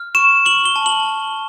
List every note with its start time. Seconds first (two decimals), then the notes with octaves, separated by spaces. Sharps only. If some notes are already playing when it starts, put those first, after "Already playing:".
Already playing: F6
0.15 C#6 E7
0.46 C#6 F#7
0.65 G7
0.76 A5
0.86 F#7